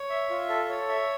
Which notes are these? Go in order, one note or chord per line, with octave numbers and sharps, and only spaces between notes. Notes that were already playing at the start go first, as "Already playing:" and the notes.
Already playing: C#5
E5
F4
A4
C#5
E5